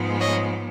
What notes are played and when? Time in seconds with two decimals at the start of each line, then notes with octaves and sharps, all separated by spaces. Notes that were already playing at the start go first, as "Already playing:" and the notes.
Already playing: G#2 F3 G#3 B3
0.20 C#5 D#5